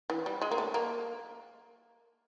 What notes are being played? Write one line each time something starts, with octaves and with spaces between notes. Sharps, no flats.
E3
G3
G#3
A#3
A3
A#3